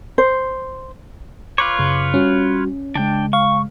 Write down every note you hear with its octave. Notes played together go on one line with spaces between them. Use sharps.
C5
F4 B4 C#5 D6
F#2 C#3
G3 C#4 F#4
C#3 G#3 D4 G5
F5 C#6